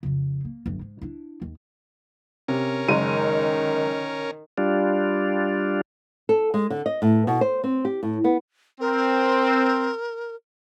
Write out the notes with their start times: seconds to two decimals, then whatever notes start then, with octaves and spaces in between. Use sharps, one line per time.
0.03 F2 C#3
0.45 A#3
0.66 G1 F#2
0.81 G#2
1.01 D4 E4
1.42 D#2
2.48 C3 C#4 A#4
2.88 F#1 D#3 G#3 D#7
4.58 G3 D4 F4
6.29 A4
6.54 G#3
6.70 D3
6.86 D#5
7.02 A2
7.27 B2
7.41 C5
7.64 C4
7.85 G4
8.03 A2
8.24 B3
8.81 C4 A#4